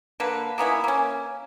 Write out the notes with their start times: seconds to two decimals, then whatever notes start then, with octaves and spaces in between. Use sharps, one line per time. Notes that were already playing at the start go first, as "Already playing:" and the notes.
0.20 D3 A#3 B4
0.58 A#3 B3 C#4 E4
0.84 A#3 C#4